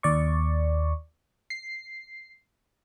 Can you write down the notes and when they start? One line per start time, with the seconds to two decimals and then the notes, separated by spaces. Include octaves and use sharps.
0.03 D#2 D5 C#6
1.50 C7